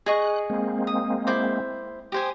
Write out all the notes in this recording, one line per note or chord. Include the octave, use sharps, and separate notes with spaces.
G#4 D#5 C#6 F#6
G#3 A#3 C4
D#6
E4 C5 D6
G4 C5 G#5 D#6